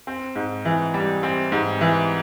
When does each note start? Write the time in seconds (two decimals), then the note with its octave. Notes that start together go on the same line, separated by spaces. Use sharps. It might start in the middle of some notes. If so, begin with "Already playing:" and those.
0.07 C4
0.36 G#2
0.65 E3
0.94 G3
1.23 C4
1.52 G#2
1.81 E3